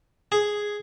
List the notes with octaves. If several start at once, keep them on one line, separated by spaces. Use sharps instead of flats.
G#4